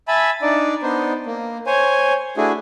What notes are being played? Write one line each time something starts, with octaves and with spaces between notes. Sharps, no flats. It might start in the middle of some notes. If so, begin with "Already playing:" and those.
E5 G#5 A5 B5
D4 D#4 D5
B3 D4 D#4 C5
A#3
C5 C#5 G#5
A3 D4 E4 F#4 G#4